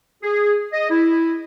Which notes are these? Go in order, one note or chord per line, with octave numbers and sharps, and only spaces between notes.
G#4
D#5
E4